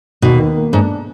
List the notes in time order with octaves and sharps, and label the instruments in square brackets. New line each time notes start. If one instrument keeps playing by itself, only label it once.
[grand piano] D#2 [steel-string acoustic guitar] B2
[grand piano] D#3
A#3
[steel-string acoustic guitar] G#2 [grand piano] D4